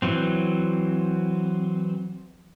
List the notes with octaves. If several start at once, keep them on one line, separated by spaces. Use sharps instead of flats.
E3 F#3 C4